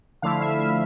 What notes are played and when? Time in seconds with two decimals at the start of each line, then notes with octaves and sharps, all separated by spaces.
0.22 D3 F3 A3 E4 F5
0.41 E5
0.59 E5